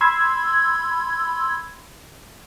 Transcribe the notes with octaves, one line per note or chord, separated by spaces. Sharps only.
B5 C6 E6 G#6